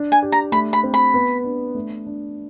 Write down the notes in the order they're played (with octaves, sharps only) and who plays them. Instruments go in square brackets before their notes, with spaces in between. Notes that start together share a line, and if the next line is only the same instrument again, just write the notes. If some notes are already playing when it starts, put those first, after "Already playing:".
Already playing: [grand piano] D4
[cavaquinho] G#5
[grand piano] G4
[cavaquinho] A#5
[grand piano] A3 [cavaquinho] B5
[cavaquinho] B5
[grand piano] C4
[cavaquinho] B5
[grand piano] B3
D4
A3
D4